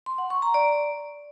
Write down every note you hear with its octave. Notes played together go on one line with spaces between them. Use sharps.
C6
F#5
C#6
A#5
D5